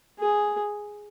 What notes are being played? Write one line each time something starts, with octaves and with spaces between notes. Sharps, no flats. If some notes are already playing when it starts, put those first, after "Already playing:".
G#4